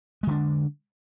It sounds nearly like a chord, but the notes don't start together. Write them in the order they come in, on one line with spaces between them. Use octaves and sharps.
G#3 D3 D4